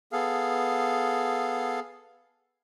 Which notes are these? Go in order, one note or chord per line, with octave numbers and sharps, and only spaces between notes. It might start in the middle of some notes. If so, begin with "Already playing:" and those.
B3 G#4 A4 F5